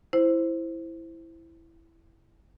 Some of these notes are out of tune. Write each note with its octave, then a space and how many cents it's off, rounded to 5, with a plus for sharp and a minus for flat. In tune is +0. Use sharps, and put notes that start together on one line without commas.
E4 +5 C5 +0